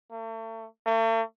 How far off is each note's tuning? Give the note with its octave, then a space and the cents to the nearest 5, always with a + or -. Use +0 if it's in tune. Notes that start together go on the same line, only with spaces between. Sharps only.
A3 +40
A3 +45